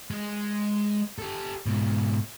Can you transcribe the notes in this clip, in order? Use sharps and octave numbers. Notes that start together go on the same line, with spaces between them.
G#3
G4 A4
G#2 B2